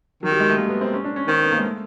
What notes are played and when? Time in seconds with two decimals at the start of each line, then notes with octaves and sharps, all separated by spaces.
0.23 D#3 F#3
0.32 G3
0.40 G#3
0.49 A3
0.57 A#3
0.69 B3
0.81 C4
0.93 C#4
1.04 D4
1.16 C#4
1.28 D#3 C4
1.40 B3
1.52 A#3
1.58 G#3
1.64 A3